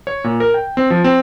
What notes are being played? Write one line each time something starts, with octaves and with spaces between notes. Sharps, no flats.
C#5
A#2
A#4
G5
C4
F3
C4